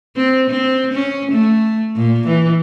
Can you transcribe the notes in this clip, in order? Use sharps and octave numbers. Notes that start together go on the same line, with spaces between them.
C4
C4
C#4
A3
A#2
E3